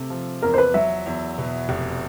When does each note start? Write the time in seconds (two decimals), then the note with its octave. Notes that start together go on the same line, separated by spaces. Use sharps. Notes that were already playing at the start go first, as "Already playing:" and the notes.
Already playing: C3 A3
0.10 F3
0.42 E2 A#4
0.54 C5
0.58 B4
0.74 F#3 E5
1.06 E2
1.38 B2
1.69 F1